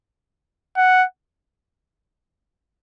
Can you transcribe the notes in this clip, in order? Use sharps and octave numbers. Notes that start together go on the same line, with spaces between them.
F#5